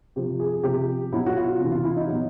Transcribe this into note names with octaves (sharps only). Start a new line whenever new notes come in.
C3 F3 G4
G#4
C3 F3 G4
B2 F#3 E4
F#4
F4
C3 E3
F4
E4
D#4
B2 F#3